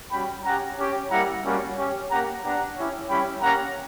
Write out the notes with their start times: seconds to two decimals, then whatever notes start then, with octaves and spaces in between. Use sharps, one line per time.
0.11 G3 C#4 F#4 G5 B5
0.44 C#4 G4 F#5 A#5
0.78 C#4 G4
1.11 G3 A#3 E4 G4 F#5 A#5
1.44 G3 A#3 C#4 F#4
1.77 C#4 G4
2.10 A#3 C#4 G4 F#5 A#5
2.42 B3 D4 G4 F#5 A#5
2.76 C#4 E4 G4
3.08 G3 C#4 E4 G4 G5 B5
3.41 A#3 C#4 G4 F#5 A#5